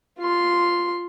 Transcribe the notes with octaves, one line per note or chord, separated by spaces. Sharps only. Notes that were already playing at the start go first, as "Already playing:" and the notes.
F4 C6